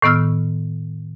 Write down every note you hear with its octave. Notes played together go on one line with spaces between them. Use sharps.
A2 D#3 B3 E6 F6